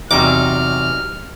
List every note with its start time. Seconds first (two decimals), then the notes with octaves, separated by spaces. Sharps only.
0.11 E2 C3 F#3 G3 D#4 D6 F6